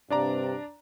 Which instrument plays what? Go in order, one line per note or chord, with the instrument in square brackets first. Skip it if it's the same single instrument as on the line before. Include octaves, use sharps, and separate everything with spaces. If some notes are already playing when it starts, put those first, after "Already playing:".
[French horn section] G2 C3 [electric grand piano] D4 D5 A#5